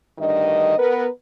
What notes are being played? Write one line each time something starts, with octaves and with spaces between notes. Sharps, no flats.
D2 G2 D#3 D#5
B3 A#4 B4